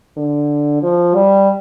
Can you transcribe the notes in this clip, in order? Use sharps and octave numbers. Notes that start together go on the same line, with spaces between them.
D3
F3
G3